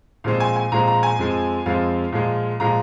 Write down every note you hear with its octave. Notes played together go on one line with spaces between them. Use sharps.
A#2 F3 G#3 C4 F5
G#5
G#5
A#2 F3 G#3 C4 A#5
A#5
G#5
F2 F3 G#3 C4
F2 F3 G#3 C4 F5
A#2 F3 G#3
A#2 F3 G#3 A#5